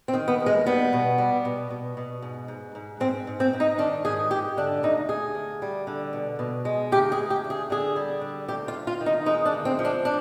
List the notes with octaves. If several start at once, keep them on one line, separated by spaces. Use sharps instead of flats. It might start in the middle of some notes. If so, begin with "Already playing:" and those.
C4
D#3
B3
D#2
G#3
G3 B3
B2
G3
B2
B2
B2
G#2
G#2
G#2
G#2 C4
G#2
C4
G#2
D#4
D#3 D4
G#2 G#4
G#2 G4
D3 D4
D2 D#4
D2 G#4
D2
G3
D3
B2
B2
G#3
D2 G4
G#4
D2
G4
D2
G#4
D3 G#4
G3
D3
D2 G4
F4
D2
F4
D#3
D#4
G#3 D#4
D4
D2
C4
F3
D4
D4